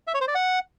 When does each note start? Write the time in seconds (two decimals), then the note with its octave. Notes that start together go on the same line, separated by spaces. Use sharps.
0.07 E5
0.14 C#5
0.21 C5
0.28 D5
0.35 F#5